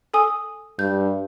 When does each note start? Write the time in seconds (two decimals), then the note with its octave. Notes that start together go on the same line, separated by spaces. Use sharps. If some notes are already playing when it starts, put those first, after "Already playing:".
0.14 A4 G#5 D#6
0.79 G2 G6